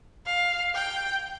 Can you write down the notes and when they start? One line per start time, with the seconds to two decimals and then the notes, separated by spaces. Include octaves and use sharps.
0.26 F5
0.75 G5